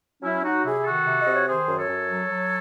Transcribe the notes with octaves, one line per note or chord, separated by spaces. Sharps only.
F#3 C#4 E4
F#3 D#4 F#4
C3 E4 G#4
D#3 F#4 A4
C3
D#5
C3
C#5
D#3 G#4 C5
F#2
A4 C#5
F#2
F#3
F#3